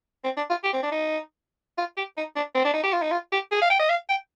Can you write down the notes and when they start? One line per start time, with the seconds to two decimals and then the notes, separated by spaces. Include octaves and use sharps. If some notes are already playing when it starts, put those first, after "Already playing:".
0.24 C4
0.37 D4
0.50 F4
0.64 G4
0.73 C4
0.83 D4
0.92 D#4
1.78 F4
1.97 G4
2.17 D#4
2.36 D4
2.55 C4
2.65 D4
2.74 D#4
2.83 G4
2.93 F4
3.02 D#4
3.11 F4
3.32 G4
3.51 G#4
3.62 F5
3.70 G5
3.80 D#5
3.89 F5
4.09 G5